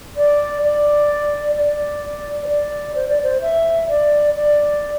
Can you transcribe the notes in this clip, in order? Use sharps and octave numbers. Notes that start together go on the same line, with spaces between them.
D5
D5
D5
C5
D5
C5
D5
C5
E5
D5
D5